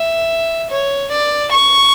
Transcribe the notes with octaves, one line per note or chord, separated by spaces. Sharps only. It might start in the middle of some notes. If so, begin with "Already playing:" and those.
Already playing: E5
C#5
D5
C#6